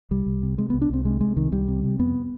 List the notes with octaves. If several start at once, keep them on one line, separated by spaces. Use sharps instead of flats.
C2 G3
C2
C3
C3 G#3
C2 B3
D4
C2 C4
C3 G#3
C3 G#3
C2 D#3
C2 G3
C3
C3
F2 B3